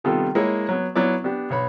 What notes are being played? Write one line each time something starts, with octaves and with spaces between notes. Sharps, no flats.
C3 D#3 G3 B3 F4 A4
G#3 A#3 E4 C#5
F#3 B3
F#3 B3 E4 D5
B3 D4 G4
B1 C#5 B5